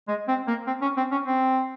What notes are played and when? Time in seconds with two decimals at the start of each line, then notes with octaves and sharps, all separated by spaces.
0.08 G#3
0.28 C4
0.47 A#3
0.67 C4
0.82 C#4
0.97 C4
1.12 C#4
1.26 C4